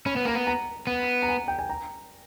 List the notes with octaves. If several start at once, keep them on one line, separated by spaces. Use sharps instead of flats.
C#4 B5
B3
A#3 A#5
B3
A#5
B3
A#5
G#5
G5
G#5
A#5